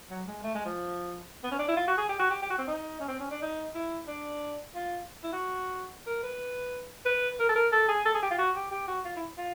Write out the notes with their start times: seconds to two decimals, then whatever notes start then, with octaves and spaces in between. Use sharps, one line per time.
0.10 F#3
0.27 G#3
0.43 A3
0.55 G#3
0.65 F3
1.43 B3
1.51 C#4
1.59 D4
1.68 E4
1.77 F4
1.87 F#4
1.98 G#4
2.09 G4
2.19 F#4
2.30 G4
2.42 G4
2.50 F#4
2.58 C4
2.68 D#4
3.00 C#4
3.08 C4
3.20 C#4
3.31 D4
3.42 D#4
3.75 E4
4.07 D4
4.75 F4
5.24 E4
5.33 F#4
6.07 A#4
6.23 B4
7.05 B4
7.40 A#4
7.49 A4
7.55 A#4
7.72 A4
7.88 G#4
8.05 A4
8.14 G#4
8.23 G4
8.31 F4
8.38 F#4
8.56 G4
8.71 G4
8.88 F#4
9.05 F4
9.16 E4
9.38 F4